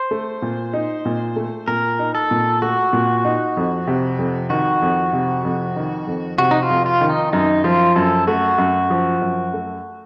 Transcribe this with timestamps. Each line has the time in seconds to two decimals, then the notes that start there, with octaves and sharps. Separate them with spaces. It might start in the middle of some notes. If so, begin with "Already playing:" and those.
Already playing: C5
0.11 A3
0.42 A#2
0.73 D#4
1.05 A#2
1.36 A3
1.67 A#2 A#4
1.99 D#4
2.15 A4
2.31 A#2
2.62 A3 F#4
2.93 A#2
3.25 D#4
3.57 F2
3.87 C3
4.19 F2
4.50 D#3 F#4
4.82 F2
5.13 C3
5.45 F2
5.76 D#3
6.07 F2
6.38 C3 F#4
6.51 D#4
6.63 F4
6.70 F2
6.86 F4
7.01 D#3
7.09 D#4
7.33 F#2 D#4
7.64 F3 F4
7.96 F#2 A4
8.27 A3 F#4
8.58 F#2
8.90 F3
9.21 F#2
9.53 A3